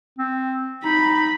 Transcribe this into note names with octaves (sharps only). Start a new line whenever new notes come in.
C4
D#4 B5